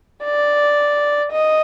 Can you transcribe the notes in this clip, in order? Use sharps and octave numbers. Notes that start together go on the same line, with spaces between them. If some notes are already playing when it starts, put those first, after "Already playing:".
D5
D#5